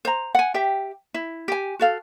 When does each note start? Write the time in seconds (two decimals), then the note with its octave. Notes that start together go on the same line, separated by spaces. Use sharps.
0.05 C5 A#5
0.35 F#5 G#5
0.54 G4 E5 G5
1.14 E4
1.48 G4 G#5
1.79 F#4 A4 F5